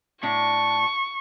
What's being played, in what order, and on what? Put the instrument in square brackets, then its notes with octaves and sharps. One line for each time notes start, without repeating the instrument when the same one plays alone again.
[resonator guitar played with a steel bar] A2 D4 [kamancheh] C#6